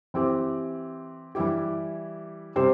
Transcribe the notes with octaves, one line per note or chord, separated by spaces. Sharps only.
E3 C4 G4
E3 G3 E4 G4
C3 G3 C4 G4 C5